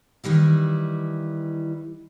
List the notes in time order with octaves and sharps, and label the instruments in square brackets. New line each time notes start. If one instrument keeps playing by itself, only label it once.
[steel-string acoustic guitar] D#3 E3 G3 E4